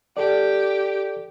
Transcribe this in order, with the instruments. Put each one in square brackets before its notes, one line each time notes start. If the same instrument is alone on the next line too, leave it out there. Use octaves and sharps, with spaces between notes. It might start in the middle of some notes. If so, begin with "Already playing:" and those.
[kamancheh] G4 [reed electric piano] A4 D5